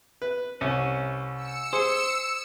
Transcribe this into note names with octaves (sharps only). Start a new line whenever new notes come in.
B4
C2 C#4
E6 C#7
G#4 C5